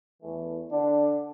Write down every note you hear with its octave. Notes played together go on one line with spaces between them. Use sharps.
E2 E3 A3
D3 D4